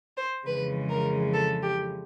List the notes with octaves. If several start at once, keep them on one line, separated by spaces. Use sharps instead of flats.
C5
F2 C#3 E3 G#3 B4
A#4
A4
G4